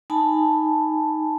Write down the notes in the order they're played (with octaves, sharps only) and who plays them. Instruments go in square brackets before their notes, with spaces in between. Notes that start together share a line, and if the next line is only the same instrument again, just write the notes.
[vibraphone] D#4 G#5 A5 B5